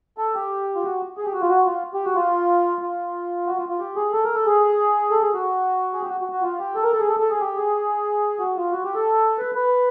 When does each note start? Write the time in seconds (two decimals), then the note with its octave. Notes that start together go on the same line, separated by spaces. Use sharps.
0.18 A4
0.34 G4
0.75 F4
0.84 F#4
1.17 G#4
1.25 G4
1.33 F#4
1.41 F4
1.50 F#4
1.66 F4
1.94 G4
2.05 F#4
2.15 F4
2.81 F4
3.46 F#4
3.57 F4
3.69 F4
3.79 G4
3.96 G#4
4.13 A4
4.24 A#4
4.35 A4
4.46 G#4
5.11 A4
5.22 G#4
5.34 F#4
5.93 G#4
6.02 G4
6.10 F#4
6.21 F#4
6.32 F#4
6.42 F4
6.59 G4
6.75 A4
6.84 A#4
6.92 A4
7.00 G#4
7.08 A4
7.20 A4
7.30 G#4
7.40 G4
7.57 G#4
8.39 F#4
8.57 F4
8.72 F#4
8.84 G4
8.95 A4
9.38 B4
9.55 B4